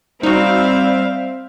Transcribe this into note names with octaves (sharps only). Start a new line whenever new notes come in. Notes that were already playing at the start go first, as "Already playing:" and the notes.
G3 C4 D#4 F#4 E5 F5